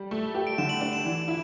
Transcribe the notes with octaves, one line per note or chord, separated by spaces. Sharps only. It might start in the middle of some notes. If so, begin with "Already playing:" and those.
Already playing: G3
A3
G4
D7
D3 E7
F#7
D4 F#7
E7
E3
E4